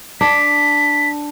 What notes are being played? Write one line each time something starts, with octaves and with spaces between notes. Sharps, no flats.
D4 B6